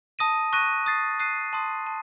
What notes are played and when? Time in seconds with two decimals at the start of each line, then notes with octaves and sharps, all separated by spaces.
0.19 A5 D#6 A#6 D#7
0.53 C#6 F#6 A#6 D#7
0.86 D#6 A6 C7
1.19 D#6 F#6 C7 D#7
1.53 A5 C6 D#6
1.87 A5